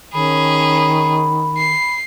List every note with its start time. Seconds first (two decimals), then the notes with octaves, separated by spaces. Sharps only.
0.13 D#3 C#4 G#4 B5
1.57 C7